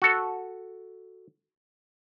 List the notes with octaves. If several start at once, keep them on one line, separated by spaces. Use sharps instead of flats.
F#4 A4